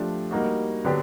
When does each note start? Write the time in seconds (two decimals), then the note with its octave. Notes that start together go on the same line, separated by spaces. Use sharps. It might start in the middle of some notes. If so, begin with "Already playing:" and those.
Already playing: F3 A3 D4 G4
0.31 G3 A#3 D#4 F#4
0.84 D3 F#3 B3 D4 G4